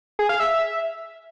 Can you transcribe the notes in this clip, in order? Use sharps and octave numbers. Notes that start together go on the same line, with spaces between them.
G#4
F5
E5